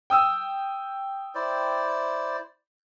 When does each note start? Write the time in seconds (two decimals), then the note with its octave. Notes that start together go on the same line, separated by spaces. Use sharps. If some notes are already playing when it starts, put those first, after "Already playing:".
0.10 G5 D#6 E6
1.35 E4 C5 D5